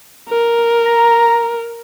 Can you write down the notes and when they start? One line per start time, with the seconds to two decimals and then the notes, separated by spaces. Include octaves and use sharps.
0.29 A#4
0.85 A#5